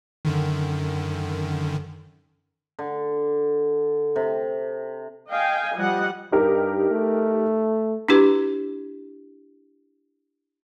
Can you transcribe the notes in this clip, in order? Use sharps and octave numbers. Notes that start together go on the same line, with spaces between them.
F#2 D3 D#3
D3
C3
D#5 F5 G5 G#5
F3 G3 D#5 F#5
G2 D#4 G4 A#4
A3
D4 E4 F#4 G4 B4